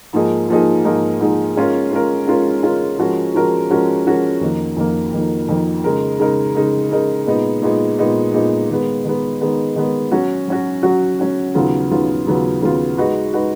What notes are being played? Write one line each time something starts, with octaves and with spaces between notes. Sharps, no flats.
G#2 F3 A#3 D#4 G#4
G#2 F3 A#3 D#4 G#4
G#2 F3 A#3 D#4 G#4
G#2 F3 A#3 D#4 G#4
G#3 C#4 F4 A#4
G#3 C#4 F4 A#4
G#3 C#4 F4 A#4
G#3 C#4 F4 A#4
F3 G#3 C#4 F#4 A#4
F3 G#3 C#4 F#4 A#4
F3 G#3 C#4 F#4 A#4
F3 G#3 C#4 F#4 A#4
F2 D#3 A#3
F2 D#3 A#3
F2 D#3 A#3
F2 D#3 A#3
C#3 G#3 D#4 A#4
C#3 G#3 D#4 A#4
C#3 G#3 D#4 A#4
C#3 G#3 D#4 A#4
A#2 G#3 B3 D#4
A#2 G#3 B3 D#4
A#2 G#3 B3 D#4
A#2 G#3 B3 D#4
D#3 G#3 B3
D#3 G#3 B3
D#3 G#3 B3
D#3 G#3 B3
F#3 C#4 F#4
F#3 C#4 F#4
F#3 C#4 F#4
F#3 C#4 F#4
D#2 C#3 F#3 B3 F4
D#2 C#3 F#3 B3 F4
D#2 C#3 F#3 B3 F4
D#2 C#3 F#3 B3 F4
G#3 D#4 F#4 B4
G#3 D#4 F#4 B4